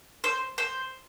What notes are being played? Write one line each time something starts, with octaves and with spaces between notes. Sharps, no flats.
C5
C5